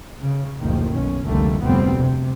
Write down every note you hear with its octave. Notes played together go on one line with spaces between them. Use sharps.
C#3
F#1 D2 A#2 D#3 F3
B1 B2 C#4
F1 C#2 D3 G3 A3 A#3
F1 D2 A2 G3 B3 C4
C3